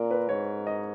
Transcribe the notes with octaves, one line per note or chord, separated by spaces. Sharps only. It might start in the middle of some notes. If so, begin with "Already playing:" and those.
Already playing: A#2 A#4
B4
G#2 C#5
D#5